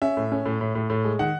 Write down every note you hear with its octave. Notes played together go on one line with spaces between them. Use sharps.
C#4 E5
A2
C#4
A2
A2
A2
A2
G#3
D#3 F#5